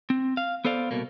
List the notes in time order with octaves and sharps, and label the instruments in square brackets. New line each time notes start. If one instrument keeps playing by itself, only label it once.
[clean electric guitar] C4
F5
B3 A4 C5 D5 F5
C2 B2 A#3